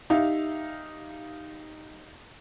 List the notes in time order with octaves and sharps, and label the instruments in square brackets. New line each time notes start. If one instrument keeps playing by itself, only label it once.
[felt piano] D#4 G4 E5 F5